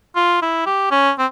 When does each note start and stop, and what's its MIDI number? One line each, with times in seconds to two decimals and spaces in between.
0.16 0.38 65
0.42 0.64 64
0.66 0.89 67
0.91 1.11 61
1.19 1.26 60